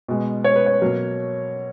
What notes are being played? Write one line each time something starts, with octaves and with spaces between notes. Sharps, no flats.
B2 G#3
C#5
B4
C#5
B2 F#3 A#3